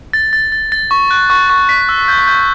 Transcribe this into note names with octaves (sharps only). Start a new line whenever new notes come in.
A6
A6
A6
A6
C#6
F#6
C#6
C#6
B6
E6
G6
G6